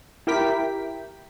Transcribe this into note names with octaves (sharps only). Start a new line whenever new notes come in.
E4 G4 A#4 G5 B6